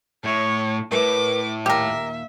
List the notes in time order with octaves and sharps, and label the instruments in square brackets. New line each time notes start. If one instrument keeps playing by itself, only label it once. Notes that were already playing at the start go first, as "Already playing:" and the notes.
[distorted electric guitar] A2 [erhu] C#5
[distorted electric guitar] A2 [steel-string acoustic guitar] A#4 B4 C#5 [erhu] D6
[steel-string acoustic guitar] D#2 A#2 F5 [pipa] G4 A#4 [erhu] E5